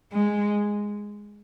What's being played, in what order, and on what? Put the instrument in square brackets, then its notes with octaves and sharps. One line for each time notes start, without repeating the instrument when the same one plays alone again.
[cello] G#3